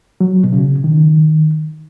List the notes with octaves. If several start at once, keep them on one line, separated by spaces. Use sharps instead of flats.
F#3
B2
C#3
D#3